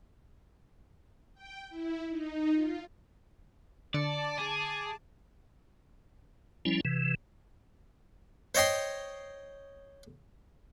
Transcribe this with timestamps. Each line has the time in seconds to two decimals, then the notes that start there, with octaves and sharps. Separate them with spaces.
1.34 G5
1.70 E4
2.09 D#4
2.53 F4
3.94 D3 D5 A5 D6 C#7
4.38 G#4
6.65 F3 G3 C#4 E4
6.85 C3 E3
8.55 C5 C#5 D#5 G5 C6